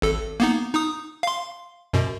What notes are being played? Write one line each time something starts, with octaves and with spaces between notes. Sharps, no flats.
G#1 A4
A#3 B3 D#4
D#4 D#6
F5 C6
F#2 B2